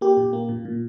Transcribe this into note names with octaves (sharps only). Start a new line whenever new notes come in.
A#3 G4
A#2
A#3
A#2
A#2